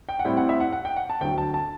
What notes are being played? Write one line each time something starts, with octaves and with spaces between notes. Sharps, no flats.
G5
F#5
A2 G3 C4 E4 G5
F#5
E5
F#5
F#5
G5
F#5
A5
D2 D3 F#3 G5
A5
A5